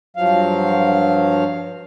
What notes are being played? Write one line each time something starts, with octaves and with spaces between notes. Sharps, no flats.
G2 F3 F#3 F5